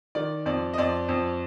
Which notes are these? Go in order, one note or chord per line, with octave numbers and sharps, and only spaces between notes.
D#3 D5
F2 D5
D#5
F2 D5
F2